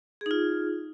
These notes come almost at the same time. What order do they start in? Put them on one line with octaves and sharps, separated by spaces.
G#4 D#4 F4